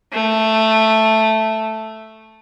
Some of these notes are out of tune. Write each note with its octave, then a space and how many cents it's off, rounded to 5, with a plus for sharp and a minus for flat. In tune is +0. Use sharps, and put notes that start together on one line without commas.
A3 +0